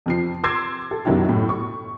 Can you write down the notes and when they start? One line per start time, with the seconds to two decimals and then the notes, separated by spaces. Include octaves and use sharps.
0.06 F2 F3 C7
0.44 C6 D6 E6 G#6 C7
0.91 A4
1.05 B1 F#2 D#3 F#3 E4 G4
1.29 A2
1.49 C#6